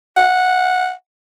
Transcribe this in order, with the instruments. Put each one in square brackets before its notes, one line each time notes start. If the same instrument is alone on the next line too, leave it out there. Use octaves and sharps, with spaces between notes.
[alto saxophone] F#5